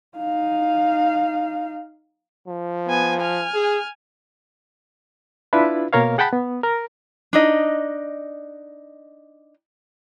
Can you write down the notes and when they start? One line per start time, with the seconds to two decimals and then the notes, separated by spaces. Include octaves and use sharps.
0.17 D#4 F5
2.48 F3
2.88 B3 G#5
3.20 G#5 F6
3.54 G#4
5.53 D4 E4 F4 B4
5.93 B2 A#3 A#4 C#5 F5
6.18 G#4 F#5 G5 A5 B5 F#6
6.33 B3
6.63 A#4
7.33 D4 D#4 D#5